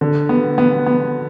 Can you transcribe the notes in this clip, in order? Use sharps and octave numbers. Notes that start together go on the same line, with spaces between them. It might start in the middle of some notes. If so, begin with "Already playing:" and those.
D3
B3
B3
B3